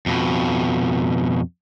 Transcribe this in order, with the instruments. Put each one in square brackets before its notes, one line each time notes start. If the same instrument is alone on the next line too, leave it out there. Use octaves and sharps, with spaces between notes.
[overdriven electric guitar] F2 B2